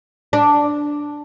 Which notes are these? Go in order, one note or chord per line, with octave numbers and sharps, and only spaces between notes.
D4